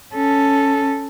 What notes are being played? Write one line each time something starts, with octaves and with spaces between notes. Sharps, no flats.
C#4 A4